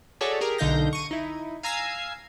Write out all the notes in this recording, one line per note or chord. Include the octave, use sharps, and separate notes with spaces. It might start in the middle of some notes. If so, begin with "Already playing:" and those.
F#4 G#4 A4 C#5 D5 E5
G4 G#4 A#4
B1 D3 D#4 F5 G6 A#6
C#6 D#7
D#4 E4
F5 G#5 A#5 E6 G#6 C7